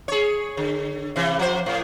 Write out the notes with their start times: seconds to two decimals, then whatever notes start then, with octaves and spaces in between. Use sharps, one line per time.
0.08 G#4 C#5
0.57 D3
1.16 C3 E3
1.39 F3 C5
1.66 A2